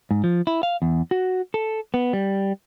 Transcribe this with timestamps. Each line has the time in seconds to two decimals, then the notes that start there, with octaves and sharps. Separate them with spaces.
0.11 G#2
0.24 F3
0.47 E4
0.63 F5
0.82 E2
1.11 F#4
1.54 A4
1.94 B3
2.13 G3